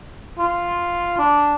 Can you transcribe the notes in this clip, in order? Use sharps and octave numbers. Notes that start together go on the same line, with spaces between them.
F4
D4